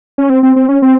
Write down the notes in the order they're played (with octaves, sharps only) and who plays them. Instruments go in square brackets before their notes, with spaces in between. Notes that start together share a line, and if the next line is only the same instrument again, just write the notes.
[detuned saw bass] C#4
C4
C4
C4
C#4
C4